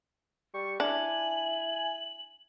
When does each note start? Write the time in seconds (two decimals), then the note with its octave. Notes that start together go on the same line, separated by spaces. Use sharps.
0.54 G3 C#6
0.80 D4 E4 G#5 F#7